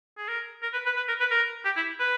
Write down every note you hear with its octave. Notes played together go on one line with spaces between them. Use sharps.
G#4
A#4
A#4
B4
B4
B4
A#4
B4
A#4
G4
E4
B4